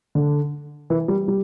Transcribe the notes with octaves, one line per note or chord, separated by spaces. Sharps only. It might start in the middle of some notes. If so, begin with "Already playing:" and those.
D3
E3
G3
G3